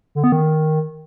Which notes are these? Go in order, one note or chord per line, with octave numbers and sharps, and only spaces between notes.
D3
B3
D#3